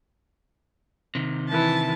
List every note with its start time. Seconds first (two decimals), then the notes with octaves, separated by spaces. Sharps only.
1.15 C3 D#3
1.49 E3 A5